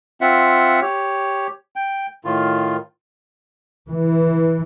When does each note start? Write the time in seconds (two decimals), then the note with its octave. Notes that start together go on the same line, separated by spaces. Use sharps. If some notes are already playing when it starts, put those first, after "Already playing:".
0.21 C4 F4 E5 F#5
0.82 G4 C#5
1.76 G5
2.25 A2 D#3 F4
3.89 E3